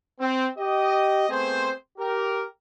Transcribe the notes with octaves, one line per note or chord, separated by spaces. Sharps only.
C4
G4 D#5
A3 B3 C4 G#4 C5
G4 A#4